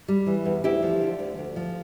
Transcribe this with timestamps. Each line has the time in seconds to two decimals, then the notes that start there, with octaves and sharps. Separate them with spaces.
0.08 G3
0.27 E3
0.45 E2
0.64 D2 E4 G4
0.83 F3
1.01 D3
1.19 D2
1.38 D2
1.56 F3